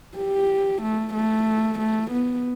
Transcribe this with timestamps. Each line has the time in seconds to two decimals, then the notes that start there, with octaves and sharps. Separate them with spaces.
0.18 G4
0.82 A3
1.14 A3
1.79 A3
2.11 B3